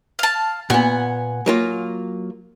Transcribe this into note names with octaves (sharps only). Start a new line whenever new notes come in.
F5 A5
A#2 B3 F#5 G#5
F#3 A#3 F4